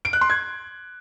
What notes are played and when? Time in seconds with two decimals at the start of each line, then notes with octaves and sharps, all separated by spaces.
0.05 D7
0.13 F#6
0.21 C6
0.30 G#6